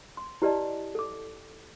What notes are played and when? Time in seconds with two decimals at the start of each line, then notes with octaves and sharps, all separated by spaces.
0.17 C6
0.42 E4 G4 B4 D5 D#5 A5
0.95 A4 D6